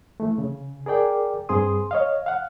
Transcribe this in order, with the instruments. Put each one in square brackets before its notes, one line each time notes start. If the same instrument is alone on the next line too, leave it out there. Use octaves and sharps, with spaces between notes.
[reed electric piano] E3 A3
C#3
G#4 A#4 D5 G5 D6
G2 G3 C4 G#4 C6 D#6
C#5 D#5 F5
F5 F#5